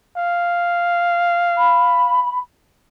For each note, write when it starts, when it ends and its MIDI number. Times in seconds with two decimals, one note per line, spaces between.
0.17 2.32 77
1.57 2.38 83